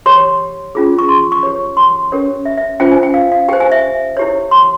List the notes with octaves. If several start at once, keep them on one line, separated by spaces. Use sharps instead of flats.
G4 C#5 C6
C#4 F4 G#4
C#6
C6
C#6
G4 C#5
C6
C#4 G4 A#4 C#5
E5
E5
C#4 F4 C5 G5
G#5
G5
F5
F5
G4 C5 G5
G#5
E5
E4 G4 C#5
C6